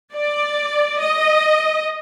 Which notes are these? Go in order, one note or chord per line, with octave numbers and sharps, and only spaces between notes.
D5
D#5